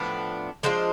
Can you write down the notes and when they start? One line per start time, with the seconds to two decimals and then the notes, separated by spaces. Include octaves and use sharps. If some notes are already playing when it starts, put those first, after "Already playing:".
Already playing: A2 F3 B3 D4
0.63 F3 G#3 D4 F4 C5